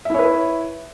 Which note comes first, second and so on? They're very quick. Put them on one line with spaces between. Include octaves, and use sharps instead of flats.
E5 E4 C#5 B4